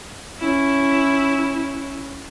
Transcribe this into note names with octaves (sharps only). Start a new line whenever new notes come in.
C#4 E4